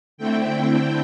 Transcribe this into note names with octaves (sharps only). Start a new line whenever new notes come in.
D3 A3 C4 E4 G5